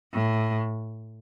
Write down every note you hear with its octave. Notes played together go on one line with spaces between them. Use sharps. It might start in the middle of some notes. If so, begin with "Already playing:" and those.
A2